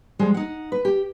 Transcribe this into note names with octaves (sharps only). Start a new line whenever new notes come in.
F3 G3 G#3
D#4 F#5
B4
G4